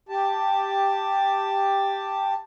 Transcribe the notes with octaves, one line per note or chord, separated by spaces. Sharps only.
G4 A5